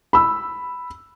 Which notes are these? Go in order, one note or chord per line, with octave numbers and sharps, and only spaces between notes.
B5 E6